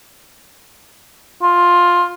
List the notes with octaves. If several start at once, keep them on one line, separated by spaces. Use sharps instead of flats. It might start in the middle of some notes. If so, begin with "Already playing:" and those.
F4